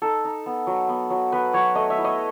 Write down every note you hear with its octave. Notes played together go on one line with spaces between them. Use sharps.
D#4 A4
D#4
B3
F#3
B3
F#3
B3 B4
F#3 C#5
A3 D#5
E5
E4
D#5